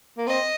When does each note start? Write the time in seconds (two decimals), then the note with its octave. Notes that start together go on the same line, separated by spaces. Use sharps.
0.18 A#3
0.27 C4 D#5